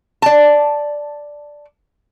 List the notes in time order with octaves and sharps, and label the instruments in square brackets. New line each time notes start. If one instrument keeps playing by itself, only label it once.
[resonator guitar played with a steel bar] D5 A5